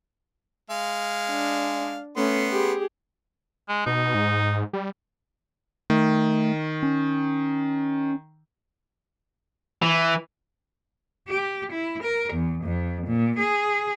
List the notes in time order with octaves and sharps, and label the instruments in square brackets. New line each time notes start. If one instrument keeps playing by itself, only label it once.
[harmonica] G#3 F5
[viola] D4
[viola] A3 C#4 [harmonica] B3 C6
[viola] G4 G#4
[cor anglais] G#3
[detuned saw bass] B2 [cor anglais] D#4
[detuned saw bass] G#2
G3
[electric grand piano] D#3 [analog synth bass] A3
[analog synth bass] C#4
[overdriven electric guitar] E3
[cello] G4
E4
A#4
E2
F2
A#2
G#4